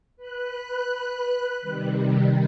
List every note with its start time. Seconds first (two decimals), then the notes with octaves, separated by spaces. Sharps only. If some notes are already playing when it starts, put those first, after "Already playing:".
0.17 B4 F#6
1.61 C3 D#3 G3